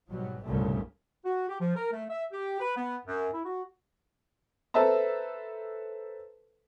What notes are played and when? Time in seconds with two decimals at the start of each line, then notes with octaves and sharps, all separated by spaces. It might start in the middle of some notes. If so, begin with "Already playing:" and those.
0.10 G#2 B2 F#3 G3
0.46 C2 G2 A#2 C#3 G3 A3
1.24 F#4
1.49 G4
1.60 F3
1.76 A#4
1.92 A3
2.10 E5
2.32 G4
2.60 B4
2.76 B3
3.06 F#2
3.33 E4
3.45 F#4
4.74 A4 B4 C5 E5 A5 A#5